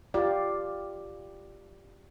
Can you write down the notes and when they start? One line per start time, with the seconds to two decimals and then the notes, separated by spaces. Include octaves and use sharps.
0.14 F4 G4 D5